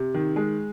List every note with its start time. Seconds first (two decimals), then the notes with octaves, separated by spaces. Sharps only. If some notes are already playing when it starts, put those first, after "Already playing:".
Already playing: C3
0.14 D#3
0.36 G#3